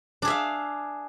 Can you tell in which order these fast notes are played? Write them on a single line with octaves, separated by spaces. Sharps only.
D4 G#4 E5 F5